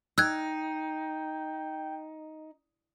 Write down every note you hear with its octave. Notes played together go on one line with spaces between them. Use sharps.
D#4 G5 E6 F#6 G#6